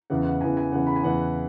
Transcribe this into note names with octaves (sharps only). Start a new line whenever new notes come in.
E2 C#3 E3 F#5
F#5
E2 C#3 E3 G#5
G#5
E2 C#3 E3 F#5
B5
G#5
E2 C#3 E3 F#5